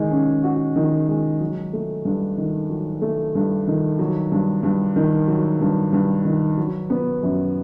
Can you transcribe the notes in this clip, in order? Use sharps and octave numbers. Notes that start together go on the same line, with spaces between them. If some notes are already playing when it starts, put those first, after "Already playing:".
Already playing: D#3 G#3
C#4
F#4
D#3
G#3
F#3
A3
G2
D#3
F#3
A3
G2
D#3
F#3
G2
G2
D#3
F#3
G2
G2
D#3
F#3
B3
F#2